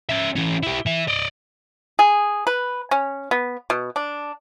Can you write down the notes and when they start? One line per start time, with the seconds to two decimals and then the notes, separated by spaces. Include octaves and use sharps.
0.09 C#4 E5
0.36 E3 C#4
0.63 E4 G4
0.86 E3 E5
1.08 D5 D#5
1.99 G#4
2.47 B4
2.91 C#4
3.31 B3
3.70 B2
3.96 D4